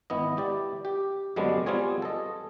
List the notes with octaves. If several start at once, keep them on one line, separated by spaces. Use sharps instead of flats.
G#1 B3 E4 D#5
E4 G4 D5
G4
F#2 D3 G3 G#3 B3 D4
G3 B3 C4 F4 G#4 C#5
A4 D#5